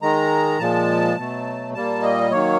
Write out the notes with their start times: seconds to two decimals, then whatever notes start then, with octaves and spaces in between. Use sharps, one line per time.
0.02 D#3 G#3 A#5
0.59 A#2 F3 G#3 A5
1.17 B2 F#3 A3
1.74 A#2 G3 A#3 A5
2.03 D#5
2.31 D#3 F#3 A#3 C#5